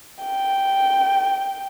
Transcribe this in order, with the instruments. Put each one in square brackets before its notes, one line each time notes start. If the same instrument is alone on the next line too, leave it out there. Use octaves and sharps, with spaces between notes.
[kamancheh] G5